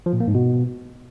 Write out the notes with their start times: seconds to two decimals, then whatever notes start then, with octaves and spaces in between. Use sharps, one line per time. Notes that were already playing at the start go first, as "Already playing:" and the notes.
0.06 F3
0.13 A#2
0.20 A#3
0.28 G#2
0.35 B2